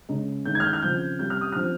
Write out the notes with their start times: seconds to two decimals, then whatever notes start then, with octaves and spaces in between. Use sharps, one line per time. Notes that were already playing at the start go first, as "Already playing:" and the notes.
0.09 C#3 G#3 C#4
0.45 D#3 G#3 C#4 G6
0.55 G#6
0.60 F6
0.64 G6
0.73 F6
0.82 C#3 F3 C4 G6
1.19 C3 G3 C#4 G6
1.30 F6
1.41 D#6
1.52 F3 C4 F6